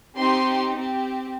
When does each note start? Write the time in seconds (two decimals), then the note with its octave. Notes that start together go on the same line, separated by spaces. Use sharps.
0.17 C4 D#4 G4 C6
0.75 C4 G4